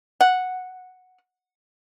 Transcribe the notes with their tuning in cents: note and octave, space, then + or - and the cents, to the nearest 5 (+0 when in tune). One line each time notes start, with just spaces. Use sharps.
F#5 -5